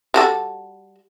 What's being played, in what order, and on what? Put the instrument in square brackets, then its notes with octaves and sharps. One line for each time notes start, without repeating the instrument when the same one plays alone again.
[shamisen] G3 F#4 A4